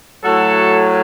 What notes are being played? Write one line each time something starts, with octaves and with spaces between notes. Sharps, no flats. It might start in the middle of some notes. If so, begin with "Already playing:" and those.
A2 F#3 A3 F#4 A4